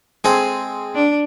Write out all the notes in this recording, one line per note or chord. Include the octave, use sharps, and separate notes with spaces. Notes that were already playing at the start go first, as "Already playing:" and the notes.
G#3 C4 G#4 A4
D4